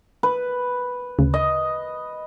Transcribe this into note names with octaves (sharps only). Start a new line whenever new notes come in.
B4
D2 C#3
D#5